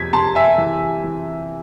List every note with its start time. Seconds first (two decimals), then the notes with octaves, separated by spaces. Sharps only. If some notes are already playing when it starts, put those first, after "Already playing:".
Already playing: F2 C3 G#6 B6
0.13 C3 A5 C6
0.35 E5 G#5
0.58 E3
1.04 E3